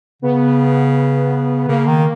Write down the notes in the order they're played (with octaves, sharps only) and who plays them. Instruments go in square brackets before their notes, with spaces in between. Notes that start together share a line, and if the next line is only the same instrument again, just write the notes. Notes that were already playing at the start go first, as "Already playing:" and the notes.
[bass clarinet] C#3 [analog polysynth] B3
[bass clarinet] C#3 [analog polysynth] A#3
[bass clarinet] D#3